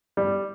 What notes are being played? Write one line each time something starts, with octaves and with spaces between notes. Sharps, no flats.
G3